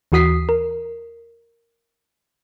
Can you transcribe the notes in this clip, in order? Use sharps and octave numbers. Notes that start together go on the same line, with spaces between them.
D#2 E3 F#4 D#6 B6 C7
A#4